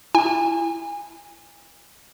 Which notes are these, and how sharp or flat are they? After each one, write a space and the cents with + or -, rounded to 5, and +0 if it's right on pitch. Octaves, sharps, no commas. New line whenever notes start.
E4 +20 G#5 -30